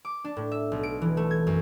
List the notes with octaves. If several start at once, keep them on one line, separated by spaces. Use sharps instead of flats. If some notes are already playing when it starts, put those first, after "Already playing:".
D6
D4
A2
E5
B1
D7
E3
A3
G#6
F#2